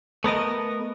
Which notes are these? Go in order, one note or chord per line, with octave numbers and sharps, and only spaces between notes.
A3 B3 A#4 D#5